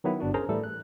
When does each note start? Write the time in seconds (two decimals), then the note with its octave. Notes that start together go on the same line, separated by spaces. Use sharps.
0.04 D#3 F#3 B3 E4
0.20 G1 D4 F#4
0.34 C#4 G#4 A#4 C5 A#5
0.48 A2 E3 G3 A3 A4
0.64 F#6